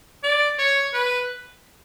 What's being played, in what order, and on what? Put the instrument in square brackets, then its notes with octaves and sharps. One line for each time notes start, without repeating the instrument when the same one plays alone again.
[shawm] D5
C#5
B4